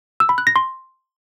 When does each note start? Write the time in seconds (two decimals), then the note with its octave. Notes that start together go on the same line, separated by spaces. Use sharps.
0.20 E6
0.29 B5
0.38 F#6
0.47 A#6
0.56 C6